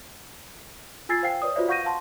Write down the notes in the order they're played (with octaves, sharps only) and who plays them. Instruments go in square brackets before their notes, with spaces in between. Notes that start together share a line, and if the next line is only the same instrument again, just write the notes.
[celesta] F4 G#5 E6 G#6 A6 C7
C5 F5 G5 C7
B4 C#5 D5 D#6
F4 F#4 B4 C5 D5 E5
F5 F#5 C#6 G6 A#6 D#7
F5 F#5 A5 C6